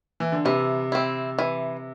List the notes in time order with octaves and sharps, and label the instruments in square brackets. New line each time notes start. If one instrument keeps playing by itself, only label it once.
[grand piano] E3
D3
[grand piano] C3 [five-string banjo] E3
[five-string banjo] C4 E4
E3